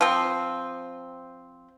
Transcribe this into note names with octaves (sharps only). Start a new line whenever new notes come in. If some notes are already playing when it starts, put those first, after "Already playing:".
F3 C4